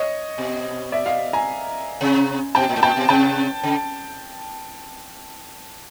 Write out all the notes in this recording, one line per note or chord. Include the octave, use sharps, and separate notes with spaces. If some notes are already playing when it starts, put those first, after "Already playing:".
Already playing: C#5 D#5
B2
D5 E5
D#5 F5
G#5 A#5
C3
B2 G5 A5
A#2
A2
A#2 G5 A5
B2
C3 G5 A5
C#3